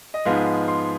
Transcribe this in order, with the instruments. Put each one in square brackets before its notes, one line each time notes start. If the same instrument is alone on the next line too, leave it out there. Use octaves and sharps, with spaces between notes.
[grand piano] D#5
G#2 F3 G#3 B3 F5
C6